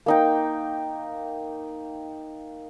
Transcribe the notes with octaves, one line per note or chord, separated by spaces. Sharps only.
A#3 D#4 G5